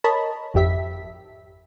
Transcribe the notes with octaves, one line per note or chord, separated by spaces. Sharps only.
A#4 C#5 D#5 A5 B5
G#1 F2 G4 E5 B6